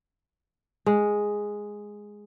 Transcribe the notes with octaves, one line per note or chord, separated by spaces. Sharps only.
G#3